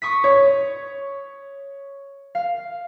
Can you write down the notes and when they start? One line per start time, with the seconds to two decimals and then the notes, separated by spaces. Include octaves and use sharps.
0.02 C#6 D#6 B6
0.24 C#5
2.35 F5